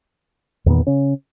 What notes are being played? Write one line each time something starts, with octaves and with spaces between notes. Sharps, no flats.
E2 A#2 D#3 B3
C#3 C#4